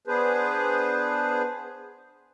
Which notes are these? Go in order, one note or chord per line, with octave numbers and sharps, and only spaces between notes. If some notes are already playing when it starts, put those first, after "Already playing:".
B3 D4 G#4 B4 C5